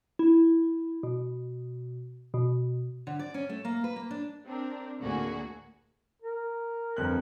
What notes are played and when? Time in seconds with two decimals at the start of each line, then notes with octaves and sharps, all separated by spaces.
0.19 E4
1.03 B2
2.34 B2
3.07 D3
3.19 D5
3.34 C#4
3.50 A3
3.65 A#3
3.84 B4
3.96 A#3
4.11 D4
4.46 C4 D4 A#4
5.00 D2 A2 D3 A#3 F#4 G#4
6.22 A#4
6.97 G1 F2 F#6